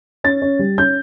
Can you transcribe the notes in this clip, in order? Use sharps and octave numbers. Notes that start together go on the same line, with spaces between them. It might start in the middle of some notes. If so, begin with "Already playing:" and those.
C#4 A6
C#4
G3
C#4 G6